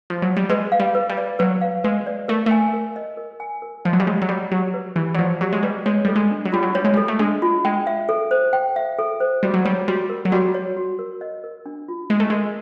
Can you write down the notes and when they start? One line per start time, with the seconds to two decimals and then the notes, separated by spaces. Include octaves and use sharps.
0.10 F3
0.22 F#3
0.37 G3
0.49 G#3 B4
0.72 F5
0.80 G3
0.95 B4
1.10 G3
1.17 D5
1.39 F#3 B4
1.61 F5
1.84 G#3 B4
2.07 D5
2.28 A3 A#4
2.46 A3 G#5
2.73 A#4
2.96 D#5
3.17 A#4
3.40 G#5
3.62 A#4
3.85 F3 D#5
3.93 F#3
4.00 G3
4.07 G#3 G4
4.22 F#3
4.29 G3 D5
4.52 F#3 G4
4.74 B4
4.96 E3 G4
5.15 F#3
5.19 F3 D5
5.41 F#3 G4
5.52 G#3
5.63 G3 B4
5.86 G#3 C#5
6.05 G3 A4
6.16 G#3
6.31 D4
6.45 F#3
6.52 G3 F4
6.63 F#3
6.75 G3 C#5
6.84 G#3
6.94 G3 A4
7.08 A3
7.19 G#3 D4
7.42 F4
7.65 G#3 G5
7.87 E5
8.09 A4
8.31 C5
8.53 G5
8.76 E5
8.99 A4
9.20 C5
9.43 G3 F#4
9.54 F#3
9.65 G3 C#5
9.88 G3 F#4
10.09 A#4
10.25 F#3
10.32 G3 F#4
10.54 C#5
10.77 F#4
10.99 A#4
11.21 D#5
11.44 A#4
11.66 D4
11.88 F4
12.10 G#3 D#5
12.20 A3
12.30 G#3 A#4